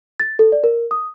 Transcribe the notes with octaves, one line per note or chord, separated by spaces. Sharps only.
A6
A4
D5
A#4
D#6